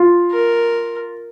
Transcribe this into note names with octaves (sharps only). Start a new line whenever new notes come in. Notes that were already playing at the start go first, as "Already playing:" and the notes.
Already playing: F4
A#4